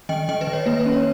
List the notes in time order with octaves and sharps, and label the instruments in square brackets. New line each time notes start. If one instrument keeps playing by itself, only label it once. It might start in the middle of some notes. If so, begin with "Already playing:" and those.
[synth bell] D#3 D#5 G5
D#3 D#5 G5
B4 D#5
D#3
C#5
A#3 B4
B4
C#4
C#5